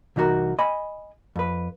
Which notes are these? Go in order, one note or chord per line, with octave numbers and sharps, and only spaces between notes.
C2 E3 D#4 F#4 A#4
D#5 G#5 B5
F2 B4